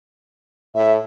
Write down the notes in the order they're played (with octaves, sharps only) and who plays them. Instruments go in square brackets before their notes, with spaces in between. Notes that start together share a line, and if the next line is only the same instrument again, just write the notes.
[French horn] A2 [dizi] E5